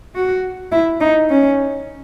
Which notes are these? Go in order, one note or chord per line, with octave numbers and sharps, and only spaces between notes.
F#4
E4
D#4
C#4